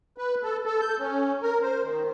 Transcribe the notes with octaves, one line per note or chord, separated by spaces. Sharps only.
B4
A4
A4
G6
C#4
A#4
C5
D#3